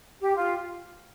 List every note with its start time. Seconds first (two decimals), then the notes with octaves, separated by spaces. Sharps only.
0.21 G4
0.36 F4